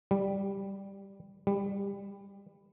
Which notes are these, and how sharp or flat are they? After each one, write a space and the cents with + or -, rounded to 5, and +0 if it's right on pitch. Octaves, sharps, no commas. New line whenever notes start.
G3 +5
G3 +25